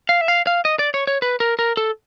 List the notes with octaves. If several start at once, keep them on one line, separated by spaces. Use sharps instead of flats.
F5
E5
F5
F5
D#5
D5
C#5
C#5
B4
A#4
A#4
A4